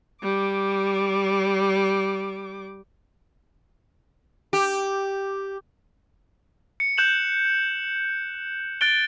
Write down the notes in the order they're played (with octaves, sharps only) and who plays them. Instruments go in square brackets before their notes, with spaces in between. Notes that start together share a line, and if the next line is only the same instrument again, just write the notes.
[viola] G3 D6
[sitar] G4
[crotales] C#7
F#6 G6 E7 F#7
F#6 A6 D7 G7